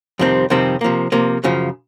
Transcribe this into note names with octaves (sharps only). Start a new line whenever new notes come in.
F2 C3 D#3 G3 C4
F2 C3 D#3 G3 C4
C3 F3 A#3
C3 F3 A#3
F#2 C#3 F3